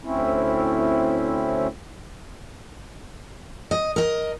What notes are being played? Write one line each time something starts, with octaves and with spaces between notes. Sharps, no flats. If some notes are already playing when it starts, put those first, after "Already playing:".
D2 C4 C#4 E4
D#5
A#4 D#5